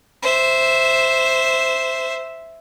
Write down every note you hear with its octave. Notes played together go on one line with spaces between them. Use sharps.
C5 E5